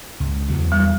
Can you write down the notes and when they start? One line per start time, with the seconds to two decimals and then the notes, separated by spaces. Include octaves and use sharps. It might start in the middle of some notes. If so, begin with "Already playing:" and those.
0.20 C#2
0.48 E2 F#3
0.72 G3